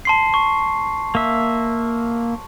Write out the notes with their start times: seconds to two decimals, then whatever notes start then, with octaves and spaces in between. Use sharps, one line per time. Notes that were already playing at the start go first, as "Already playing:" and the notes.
0.05 A5 C6 C7
0.34 C#6
1.15 A#3 E5